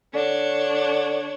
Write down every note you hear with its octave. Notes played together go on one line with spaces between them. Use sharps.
D3 D4 C#5